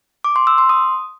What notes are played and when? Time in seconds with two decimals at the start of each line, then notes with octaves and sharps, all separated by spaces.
0.24 D6
0.36 C6
0.47 E6
0.58 C6
0.69 D#6